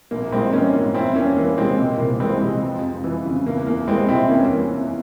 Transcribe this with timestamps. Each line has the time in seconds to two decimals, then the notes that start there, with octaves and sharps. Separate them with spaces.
0.11 A#1 A#3
0.32 A#1 G#3 C4
0.53 E3 A#3 C#4
0.74 G#2
0.94 E2 C4 E4
1.16 E2 A#3 C#4
1.37 E3 A#3
1.57 C3 G#3 C4
1.78 C2 A#3
1.99 C2 A#3
2.20 E3 G#3 C4
2.42 C3 G#3
2.63 F2
2.83 F2
3.04 E3
3.26 C#3
3.46 E2 A#3
3.66 E2 A#3
3.88 E3 G#3 C4
4.08 C3 C4 E4
4.30 E2 A#3 C#4
4.51 E3
4.72 E2